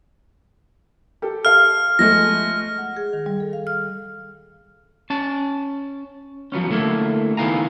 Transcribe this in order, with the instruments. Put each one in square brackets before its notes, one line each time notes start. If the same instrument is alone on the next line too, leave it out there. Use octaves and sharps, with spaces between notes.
[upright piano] G4 A4
[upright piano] A4 F5 [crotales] F6
[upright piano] F3 G#3 A3 [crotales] A#6
[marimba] F#5
G#4
D#3
G3
A4
F5
F6
[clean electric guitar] C#4 A5
F3 F#3 B3 C#4
D3 A3 A#3 E4
D#3 B3 E4 F5 G#5 A#5